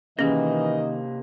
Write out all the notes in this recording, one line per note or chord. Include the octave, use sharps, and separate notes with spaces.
C3 D#3 E3 A#3 C#4 G#4 D#5